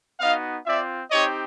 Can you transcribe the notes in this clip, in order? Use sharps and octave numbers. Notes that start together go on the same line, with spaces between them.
B3 D#4 F#4 D#5 F5
C4 F4 D5 E5
C4 D#4 G4 C#5 D#5